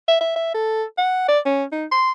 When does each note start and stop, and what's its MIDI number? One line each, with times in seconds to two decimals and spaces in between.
0.08 0.18 76
0.20 0.34 76
0.36 0.52 76
0.54 0.84 69
0.98 1.25 78
1.28 1.39 74
1.46 1.64 61
1.72 1.85 63
1.92 2.12 84